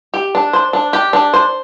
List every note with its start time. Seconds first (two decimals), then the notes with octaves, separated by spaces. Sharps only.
0.14 G4
0.35 D4
0.53 C5
0.73 D4
0.93 G4
1.13 D4
1.33 C5